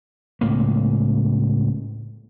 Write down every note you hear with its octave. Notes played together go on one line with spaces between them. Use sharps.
C#2 A2 A#3